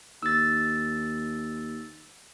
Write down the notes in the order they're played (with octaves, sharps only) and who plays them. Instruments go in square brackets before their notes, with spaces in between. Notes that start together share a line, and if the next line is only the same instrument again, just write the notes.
[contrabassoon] D#2 [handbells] E6 A6